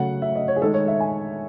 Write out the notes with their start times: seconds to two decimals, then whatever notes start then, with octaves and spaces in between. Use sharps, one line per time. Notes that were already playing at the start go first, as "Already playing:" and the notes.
Already playing: C#3 F#3 A3 F#5
0.22 E5
0.35 D#5
0.48 C#5
0.56 G#4
0.62 D#3 G#3 A4
0.74 C#5
0.88 E5
1.00 G#5